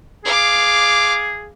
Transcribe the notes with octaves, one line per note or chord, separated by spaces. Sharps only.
G#4 F5 D6